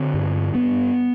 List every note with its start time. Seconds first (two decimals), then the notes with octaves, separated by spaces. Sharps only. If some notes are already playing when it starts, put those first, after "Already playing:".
Already playing: D3 C4
0.14 G2
0.54 G2 B3